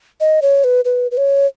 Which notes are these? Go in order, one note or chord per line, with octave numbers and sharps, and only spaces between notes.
D#5
C#5
B4
B4
B4
C#5